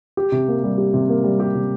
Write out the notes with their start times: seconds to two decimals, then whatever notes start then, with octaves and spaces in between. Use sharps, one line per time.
0.17 G4
0.32 C3
0.48 A#3
0.64 G3
0.78 G4
0.94 C3
1.09 A#3
1.24 G3
1.40 G4
1.55 C3